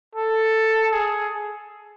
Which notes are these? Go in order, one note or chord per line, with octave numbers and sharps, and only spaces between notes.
A4
G#4